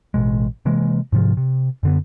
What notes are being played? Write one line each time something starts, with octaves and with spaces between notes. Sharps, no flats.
A1 B2 G#3
C3 E3 G#3 A#3
G#2 C3 E3 F3
C3
F#2 D3 B3